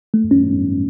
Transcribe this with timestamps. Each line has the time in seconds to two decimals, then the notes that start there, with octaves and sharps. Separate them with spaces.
0.14 A3
0.31 C#4